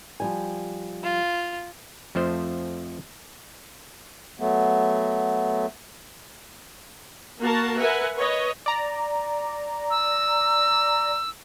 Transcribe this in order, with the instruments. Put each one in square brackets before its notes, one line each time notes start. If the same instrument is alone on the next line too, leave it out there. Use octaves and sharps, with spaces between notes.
[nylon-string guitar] F3 G3 G#5
[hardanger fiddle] F4
[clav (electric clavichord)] F2 F3 A3 C5
[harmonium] F#3 A3 B3
[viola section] A#3 F#4 A#4 A5
A#4 B4 E5 F#5 G#5
B4 C#5 D#5
[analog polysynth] D5 A#5
[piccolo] E6